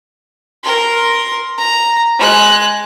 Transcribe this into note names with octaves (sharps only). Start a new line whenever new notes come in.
A#4 C6
A#5
G#3 F#6